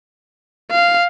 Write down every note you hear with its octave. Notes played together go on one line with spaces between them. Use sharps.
F5